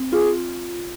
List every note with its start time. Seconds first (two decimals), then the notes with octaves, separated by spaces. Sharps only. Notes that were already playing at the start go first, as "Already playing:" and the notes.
Already playing: C4
0.12 F4 G#4